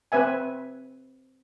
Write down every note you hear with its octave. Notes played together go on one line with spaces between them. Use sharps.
C4 B4 E5 G#5